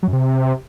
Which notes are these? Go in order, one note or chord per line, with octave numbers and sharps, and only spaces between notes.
F#3
F#2
C3